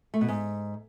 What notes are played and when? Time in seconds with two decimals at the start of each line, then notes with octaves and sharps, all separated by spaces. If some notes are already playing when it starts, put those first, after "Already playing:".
0.14 A3
0.21 B2
0.28 G#2